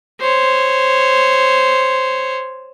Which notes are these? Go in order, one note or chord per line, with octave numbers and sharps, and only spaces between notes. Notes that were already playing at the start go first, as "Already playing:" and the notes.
C5 C#5